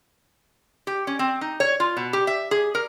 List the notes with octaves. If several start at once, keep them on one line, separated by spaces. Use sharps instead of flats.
G4
C#4
C4
D#4
C#5
F4
B2
G4
E5
G#4
A#4